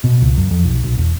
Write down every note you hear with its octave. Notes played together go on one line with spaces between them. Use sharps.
B2
C#2
F#2
F2
B1
B1
E1